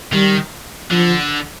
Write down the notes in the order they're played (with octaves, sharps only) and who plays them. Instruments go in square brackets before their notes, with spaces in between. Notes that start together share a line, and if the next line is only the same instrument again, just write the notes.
[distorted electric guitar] D#3 [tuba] G3
[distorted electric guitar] D3 [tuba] F3